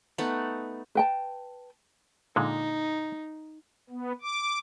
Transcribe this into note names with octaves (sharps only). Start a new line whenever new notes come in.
A3 B3 D#4 F#5
B4 G5 A5
A#2 D3 G#3 D#4
B3
D6